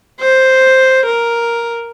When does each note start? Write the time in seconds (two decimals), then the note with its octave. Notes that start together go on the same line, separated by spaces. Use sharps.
0.20 C5
1.05 A#4